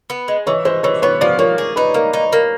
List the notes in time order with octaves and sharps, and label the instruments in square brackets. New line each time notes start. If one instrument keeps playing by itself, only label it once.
[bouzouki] B3
G#3
[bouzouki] E3 [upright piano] C#5
[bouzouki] G#3 [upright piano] C5
[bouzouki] E3 [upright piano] C#5
[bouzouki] B3 [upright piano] C#5
[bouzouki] F3 [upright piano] D5
[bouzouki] A#3 [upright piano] C#5
[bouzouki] G#4
[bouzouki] D#4 [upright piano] B4
[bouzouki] A#3
D#4
A#3